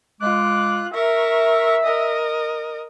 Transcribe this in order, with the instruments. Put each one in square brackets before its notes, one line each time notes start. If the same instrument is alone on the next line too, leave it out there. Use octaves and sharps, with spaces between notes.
[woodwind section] G#3 D6 [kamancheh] F4 F#6
[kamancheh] A#4 C#6 [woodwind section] E5
[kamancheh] A#4 D#5